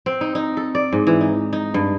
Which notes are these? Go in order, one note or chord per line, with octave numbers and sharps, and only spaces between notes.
C4
D#4
D#4
A4
D5
G#2
E3
D#4
D#4
G2